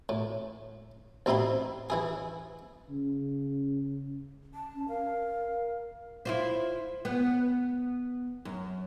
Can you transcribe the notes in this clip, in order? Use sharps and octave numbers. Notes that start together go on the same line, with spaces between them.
A2
A1 C4 D#4 E4 B5 C6
E3 E4 G#4
C#3
A5
C#4
A#4 F5
E4 F4 C5
B3
F#2